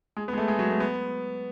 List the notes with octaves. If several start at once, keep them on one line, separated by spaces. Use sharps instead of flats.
G#3
B3
G#3
A3
G#3
F#3
A3
B3